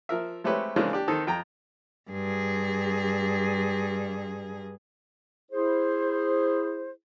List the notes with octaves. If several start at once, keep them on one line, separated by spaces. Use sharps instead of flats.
F3 A#4 E5
G#3 A3 C4 G4 B4 C#5
C#3 E3 G#3 A#3 C4 D4
D4 G4
D#3 C4 D#4 A4
F2 G5 A#5
G2 G#4
E4 G#4 C5